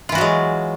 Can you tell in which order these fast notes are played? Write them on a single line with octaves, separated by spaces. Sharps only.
F4 E3 F#4 F#3 G#3